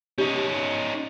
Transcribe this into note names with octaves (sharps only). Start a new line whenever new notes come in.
C#4 D#4 G4